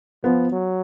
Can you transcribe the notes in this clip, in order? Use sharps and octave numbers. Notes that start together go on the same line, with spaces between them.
F3 B3
F#3